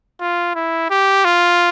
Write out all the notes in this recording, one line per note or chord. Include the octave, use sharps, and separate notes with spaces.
F4
E4
G4
F4